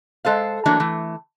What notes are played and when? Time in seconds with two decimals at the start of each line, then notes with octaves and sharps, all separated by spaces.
0.25 G#3 A4 C5 F5
0.66 E3 F#3 A3 A#3 D4
0.80 E3 A3